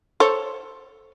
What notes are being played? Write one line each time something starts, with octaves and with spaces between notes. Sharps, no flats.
A4 C5 C#5